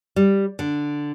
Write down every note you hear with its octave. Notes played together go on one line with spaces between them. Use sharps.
G3
D3